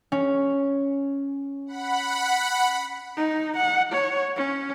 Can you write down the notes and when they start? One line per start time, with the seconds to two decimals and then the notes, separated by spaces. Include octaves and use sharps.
0.12 C#4
1.66 F#5 B5
3.17 D#4
3.57 F#5
3.92 C#5
4.36 C#4